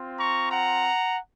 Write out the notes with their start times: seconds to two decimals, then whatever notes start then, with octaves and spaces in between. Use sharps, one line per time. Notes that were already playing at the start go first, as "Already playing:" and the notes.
Already playing: C4 F4
0.19 A#5 C#6
0.51 F#5 A#5